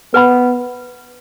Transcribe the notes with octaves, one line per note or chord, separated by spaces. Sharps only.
B3 B4 F#5 B5